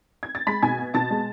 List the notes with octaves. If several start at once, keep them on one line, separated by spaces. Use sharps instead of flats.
G#6
A6
G#3 B5 B6
B2 G#5 G#6
B3
B2 A5 A6
G#3